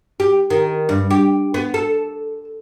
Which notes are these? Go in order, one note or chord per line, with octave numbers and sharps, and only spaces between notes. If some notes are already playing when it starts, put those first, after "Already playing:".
G4
D#3
G2
G4
B3
A4